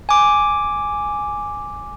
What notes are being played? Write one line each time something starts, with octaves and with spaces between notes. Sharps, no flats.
G#5 D6